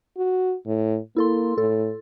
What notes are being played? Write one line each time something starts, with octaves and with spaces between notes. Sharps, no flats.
F#4
A2
A#3 E4 A4 C6
A2 A4